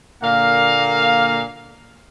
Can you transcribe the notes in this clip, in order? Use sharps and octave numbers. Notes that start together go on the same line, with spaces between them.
A#2 D3 A#3 F5